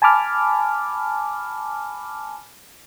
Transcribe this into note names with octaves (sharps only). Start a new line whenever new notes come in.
G#5 A5 B5 D6 F6